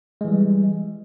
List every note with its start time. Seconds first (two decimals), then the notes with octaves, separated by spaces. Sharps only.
0.21 G#3
0.25 E3
0.28 G3